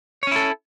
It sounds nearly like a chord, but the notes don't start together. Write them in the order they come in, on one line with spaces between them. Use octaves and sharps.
C#5 C#4 E4 A4